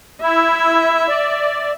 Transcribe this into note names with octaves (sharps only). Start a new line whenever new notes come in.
E4 E5
D5